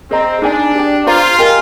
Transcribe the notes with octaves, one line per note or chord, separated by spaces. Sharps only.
C4 G#4 D#5 A#5
D4 D#4 G#4 D5 G#5
G4 D5 G5
F4 G#4 C5 F5 A#5
G4 A#4 D#5 G#5